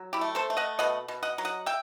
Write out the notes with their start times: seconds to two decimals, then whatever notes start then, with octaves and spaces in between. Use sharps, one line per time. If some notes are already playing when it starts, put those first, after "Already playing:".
Already playing: F#3
0.13 E4 G4
0.21 A3
0.35 A4 C5
0.50 A3
0.57 D#5 F#5
0.79 B2 D#5 F#5
1.08 B2
1.23 D#5 F#5
1.38 F#3
1.45 D#5 F#5
1.66 E5 G5